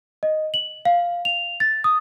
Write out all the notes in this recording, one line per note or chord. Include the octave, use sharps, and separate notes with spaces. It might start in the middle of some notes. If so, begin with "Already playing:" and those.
D#5
F#7
F5
F7
A6
D#6